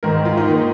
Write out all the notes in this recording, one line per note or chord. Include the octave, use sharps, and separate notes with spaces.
G#2 D#3 A#4
F4
D#4
A#3